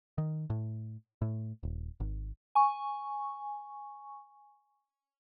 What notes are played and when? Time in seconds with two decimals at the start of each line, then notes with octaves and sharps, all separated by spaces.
0.18 D#3
0.50 A2
1.22 A2
1.63 D#1
2.00 G#1
2.55 G#5 C#6